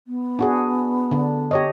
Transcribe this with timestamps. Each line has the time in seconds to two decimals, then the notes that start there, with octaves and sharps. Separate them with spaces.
0.07 B3
0.39 D4 F#4 G#4
1.11 D3 D4
1.51 G4 C#5 D#5